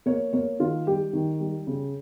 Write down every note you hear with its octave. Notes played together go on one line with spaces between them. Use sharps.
A#3 C#5
A#3 C#5
D#3 F4
G3 G4
D#3
G3
C#3